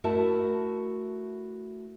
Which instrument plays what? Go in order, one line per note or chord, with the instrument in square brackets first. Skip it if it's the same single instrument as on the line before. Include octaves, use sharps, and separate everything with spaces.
[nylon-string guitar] A3 E4 F#4 A#4 E5 A5